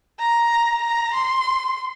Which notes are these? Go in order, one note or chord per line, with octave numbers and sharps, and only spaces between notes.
A#5
A#5
C6